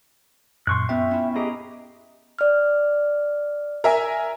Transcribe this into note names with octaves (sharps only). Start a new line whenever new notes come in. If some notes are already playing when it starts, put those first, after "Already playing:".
F#2 A#2 C6 C#6 F#6
B3 C#4 F4 E5 G5
C#4 E4
G4 G#4 D#5 A#5
D5 F6
A#4 E5 G#5